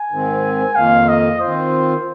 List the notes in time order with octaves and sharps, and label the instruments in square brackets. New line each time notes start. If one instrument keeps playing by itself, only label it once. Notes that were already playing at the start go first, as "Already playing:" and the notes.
Already playing: [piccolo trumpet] G#5
[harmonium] G#2 D#3 C4
[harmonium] F2 D#3 A#3 F4 [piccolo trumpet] F5
[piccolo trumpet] D#5
[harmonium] D#3 C4 F4 [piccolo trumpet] C5